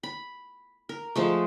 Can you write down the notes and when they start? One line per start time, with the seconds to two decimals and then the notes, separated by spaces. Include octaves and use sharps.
0.03 B5
0.89 A#4
1.16 F3 G#3 A3